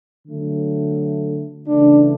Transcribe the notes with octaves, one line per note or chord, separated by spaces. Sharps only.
D3 F#3 A3
C#3 E3 A3 D4